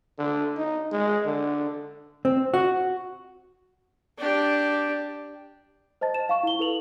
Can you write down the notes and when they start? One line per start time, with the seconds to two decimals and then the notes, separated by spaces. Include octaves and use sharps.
0.18 D3
0.57 D#4
0.92 G#3
1.26 D3
2.25 C4
2.54 F#4
4.18 D4 G4
6.01 C5 D#5 A5 A6
6.14 E7
6.29 F5 C#6
6.43 E4 G7
6.59 E4 A4 B4 F7 F#7